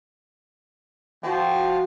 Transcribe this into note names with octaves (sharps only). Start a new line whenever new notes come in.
F3 F#4 G5